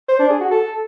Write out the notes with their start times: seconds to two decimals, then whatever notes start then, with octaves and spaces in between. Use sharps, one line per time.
0.09 C5
0.19 D4
0.30 G#4
0.41 F#4
0.51 A4